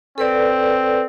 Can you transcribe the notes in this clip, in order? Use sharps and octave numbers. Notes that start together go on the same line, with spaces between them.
C4 A4 B4 D5